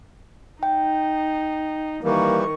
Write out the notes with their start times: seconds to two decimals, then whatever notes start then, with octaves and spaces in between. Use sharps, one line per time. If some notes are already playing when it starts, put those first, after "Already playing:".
0.63 D#4 G5
2.04 D#3 E3 G3 A#3 C#6